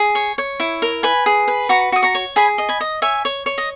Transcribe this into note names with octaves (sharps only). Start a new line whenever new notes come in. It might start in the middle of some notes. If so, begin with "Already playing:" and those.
Already playing: G#4
C#5
C#5
E4
A#4
B4 G#5 B5
G#4
B4
F#4 A#5 C#6
F#4 D#6
A#5 C#6
C#5
G#4 G#5 B5
D#5
G#5 B5
D#5
C#5 E5 G#5
C#5
C#5
D#5